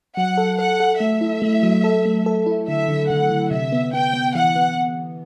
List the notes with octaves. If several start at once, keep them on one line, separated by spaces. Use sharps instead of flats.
F#3 F#5
A4
A4 F#5
A4
A3 E5
E4
A3
F#3
A4
A3
A4
E4
D3 E5
D3
D3 F#5
D3
C3 E5
B3
B3 G5
B3
E3 F#5
B3